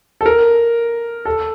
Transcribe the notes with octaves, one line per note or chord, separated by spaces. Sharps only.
A4
A#4
A4